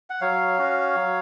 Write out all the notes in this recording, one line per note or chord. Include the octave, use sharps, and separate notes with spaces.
F#5
F#3 C#5 F5
C#4 F#4
F#3